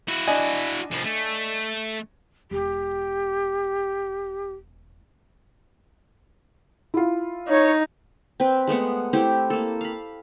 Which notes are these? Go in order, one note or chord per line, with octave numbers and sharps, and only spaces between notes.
E4 F#4
D4 D#5 G#5
C2 F3
A3
E1 G4
E4 F4
D#4 C#5
C4 B4
G#3 A3 B3 F#5
A3 C4 E4 G4
A#3 A4
F5 B5